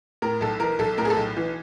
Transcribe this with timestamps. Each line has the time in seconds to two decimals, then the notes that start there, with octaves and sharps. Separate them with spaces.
0.22 A2 A#4
0.41 B1 A4
0.60 E3 A#4
0.79 B1 A4
0.98 A2 A#4
1.05 G#4
1.10 A4
1.17 B1
1.37 E3